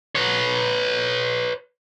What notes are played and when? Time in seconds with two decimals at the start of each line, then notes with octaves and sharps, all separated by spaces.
0.15 B4 C#5